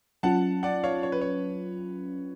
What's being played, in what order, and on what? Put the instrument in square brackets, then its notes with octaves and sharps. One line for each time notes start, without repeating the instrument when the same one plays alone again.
[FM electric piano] F#3 C#4 F4 [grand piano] F#5 A5
[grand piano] D5 F#5
C#5 F5
C#5
B4
C#5